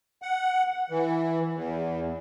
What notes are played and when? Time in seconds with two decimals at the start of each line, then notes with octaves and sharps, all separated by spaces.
0.22 F#5
0.90 E3
1.54 E2